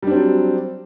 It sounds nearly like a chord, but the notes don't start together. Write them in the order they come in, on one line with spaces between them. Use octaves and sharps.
G3 D4 C4 F#3